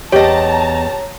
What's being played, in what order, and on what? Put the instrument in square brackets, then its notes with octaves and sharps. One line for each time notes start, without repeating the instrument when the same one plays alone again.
[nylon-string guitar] E2 D#5 [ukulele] G4 [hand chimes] C#5 [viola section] A5 A#5